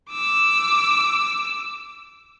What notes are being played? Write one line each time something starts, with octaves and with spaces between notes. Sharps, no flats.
D6 E6